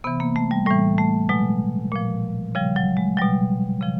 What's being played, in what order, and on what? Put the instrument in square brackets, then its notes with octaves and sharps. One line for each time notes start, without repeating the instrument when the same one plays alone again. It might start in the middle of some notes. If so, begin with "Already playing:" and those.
[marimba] C3 E3 B3
A#3
A3
G3
A2 E3 G3
A3
B2 F#3 G#3
A#2 F3
C#3 F3 G3
F#3
G#3
B2 F#3 G3
C#3 F3